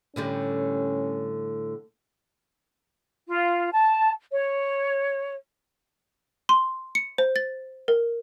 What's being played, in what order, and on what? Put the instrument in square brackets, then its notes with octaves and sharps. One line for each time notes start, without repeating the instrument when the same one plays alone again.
[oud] A2 D3 G3 [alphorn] C#4
[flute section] F4
A5
C#5
[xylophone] C6
C#7
C5
A6
A#4